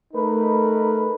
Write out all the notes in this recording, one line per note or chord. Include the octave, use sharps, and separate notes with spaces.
A3 D#4 A#4 B4